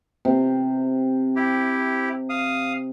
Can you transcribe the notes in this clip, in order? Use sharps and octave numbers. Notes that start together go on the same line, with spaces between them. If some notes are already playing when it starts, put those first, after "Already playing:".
C3
E4 G4
F5 D#6